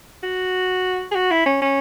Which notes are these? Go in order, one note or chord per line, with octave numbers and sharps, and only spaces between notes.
F#4
G#4
F#4
E4
C#4
C#4